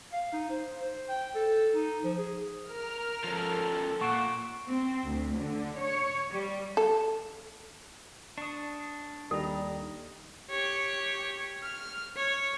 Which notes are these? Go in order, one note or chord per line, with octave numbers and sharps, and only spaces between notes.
F5
D#4
C5
C5
G5
A4
D#4
F3
G#4
A#4 F6
F3 C#4 A4
A#2 F#5 C#6 D7 E7
C4
D2
D3
C#5
G3
A4
D4 C#6 D#6
D#2 G3 D#4 A4 A#5
G4 C#5
F6
C#5